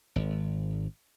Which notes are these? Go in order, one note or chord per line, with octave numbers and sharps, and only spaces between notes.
G#1